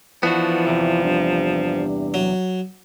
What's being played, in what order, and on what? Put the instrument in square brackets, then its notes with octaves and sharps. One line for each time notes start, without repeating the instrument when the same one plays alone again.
[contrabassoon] E3 [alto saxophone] F3 [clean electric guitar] B3 D4 F#4
[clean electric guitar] E2 C3
[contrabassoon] G2
[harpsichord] F#3